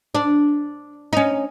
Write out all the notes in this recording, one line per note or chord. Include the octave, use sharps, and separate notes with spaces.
D4
C#4 D#4